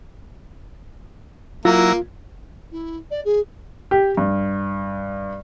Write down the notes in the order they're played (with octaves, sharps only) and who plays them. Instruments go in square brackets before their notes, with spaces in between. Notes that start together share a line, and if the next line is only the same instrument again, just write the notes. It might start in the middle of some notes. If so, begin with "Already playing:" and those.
[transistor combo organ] F#3 E4 A#5 [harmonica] A#3 [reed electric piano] F4
[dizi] E4
D5
G#4
[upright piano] G4
G2